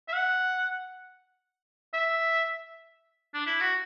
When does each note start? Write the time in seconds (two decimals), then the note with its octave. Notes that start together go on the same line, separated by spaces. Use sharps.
0.08 E5
0.13 F#5
1.94 E5
3.34 D4
3.47 E4
3.61 F#4